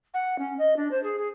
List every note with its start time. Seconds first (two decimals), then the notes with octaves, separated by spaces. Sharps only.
0.14 F#5
0.38 C#4
0.59 D#5
0.76 D4
0.91 C5
1.03 G#4
1.18 G#4